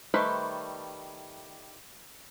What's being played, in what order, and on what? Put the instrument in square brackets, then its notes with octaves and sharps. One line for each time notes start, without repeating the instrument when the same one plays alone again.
[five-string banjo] D#3 G3 A3 B4 C5